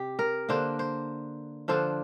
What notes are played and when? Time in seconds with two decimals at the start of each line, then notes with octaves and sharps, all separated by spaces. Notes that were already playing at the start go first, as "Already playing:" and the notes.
Already playing: C3 G4
0.19 A#4
0.49 D3 A#3 D4 C5
0.79 C5
1.68 D3 F3 D4 C5